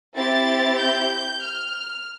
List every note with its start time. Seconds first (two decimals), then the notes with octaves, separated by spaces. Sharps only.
0.15 C4 E4 G4 A6
0.77 G6
1.39 F6